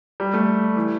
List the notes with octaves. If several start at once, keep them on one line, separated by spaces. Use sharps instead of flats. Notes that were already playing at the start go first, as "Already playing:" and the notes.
G3
A3
E3